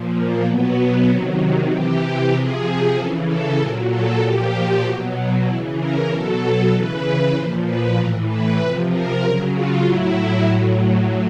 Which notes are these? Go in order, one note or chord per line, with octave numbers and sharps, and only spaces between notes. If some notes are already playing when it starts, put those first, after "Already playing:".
Already playing: A#2 F3
A#3
B2 F#3 B3
C3 D#3 F#3 C4
C3 E3 G4
C3 F3 G#4
C#3 E3 A4
A4
A#2 F#3 A#4
A4
A#2 F3 G4
B2 F#3 F#4
C#3 E3 E4
A#4
B2 F#3 A4
C#3 E3 B4
A#2 F3 C5
B4
A2 E3 A#4
B4
C3 F3 B4
A#4
C#3 F#3 A#4
F4
A2 F#3 E4
A2 F#3